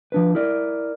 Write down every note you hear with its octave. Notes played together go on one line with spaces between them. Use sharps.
F3 D4 B4
E4 A#4 D5